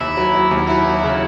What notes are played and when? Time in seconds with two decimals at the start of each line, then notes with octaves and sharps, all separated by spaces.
0.01 D#2 E4
0.17 F#3
0.35 F#3
0.51 D#2
0.68 F#3 E4
0.86 F#3
1.03 C#3